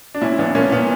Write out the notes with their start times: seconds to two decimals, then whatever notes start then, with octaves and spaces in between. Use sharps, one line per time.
0.15 D4
0.21 A#2 C#4 E4
0.38 A#1 B3 D4
0.55 A#2 A#3 C#4
0.72 A#2 B3